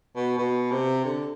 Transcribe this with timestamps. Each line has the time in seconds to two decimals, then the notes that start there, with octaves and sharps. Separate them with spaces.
0.16 B2
0.39 B2
0.72 C3
1.05 D3